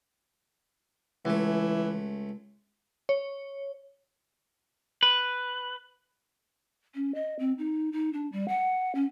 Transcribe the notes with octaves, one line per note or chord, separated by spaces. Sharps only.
C#2 E3 A3
C#5
B4
C#4
D#5
C4
D#4
D#4
D4
G3
F#5
C#4